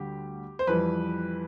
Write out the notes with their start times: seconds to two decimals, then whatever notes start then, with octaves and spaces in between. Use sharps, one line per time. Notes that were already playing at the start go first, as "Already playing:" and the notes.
Already playing: D2 D3 G3 G4
0.59 C5
0.67 F2 E3 G3 B4